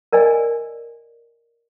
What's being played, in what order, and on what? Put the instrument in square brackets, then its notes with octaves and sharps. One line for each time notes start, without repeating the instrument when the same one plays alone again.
[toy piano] A#4 D5 D#5 G#5